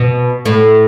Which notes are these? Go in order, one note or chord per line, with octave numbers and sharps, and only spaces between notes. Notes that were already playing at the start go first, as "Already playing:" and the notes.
Already playing: B2
A2